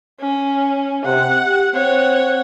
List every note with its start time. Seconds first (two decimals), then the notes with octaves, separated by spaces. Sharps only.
0.20 C#4
1.05 C3 F#5
1.46 G4
1.74 C4 C#5 F#5